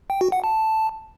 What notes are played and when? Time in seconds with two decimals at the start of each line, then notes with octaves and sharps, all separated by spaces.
0.10 G5
0.21 F#4
0.32 F#5
0.44 A5